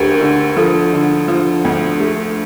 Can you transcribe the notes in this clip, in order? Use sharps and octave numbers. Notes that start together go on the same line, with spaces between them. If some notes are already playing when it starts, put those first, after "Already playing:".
Already playing: D2 D3 A3 G4 A#4
D3
F3 A4
D3
F3
D2
A3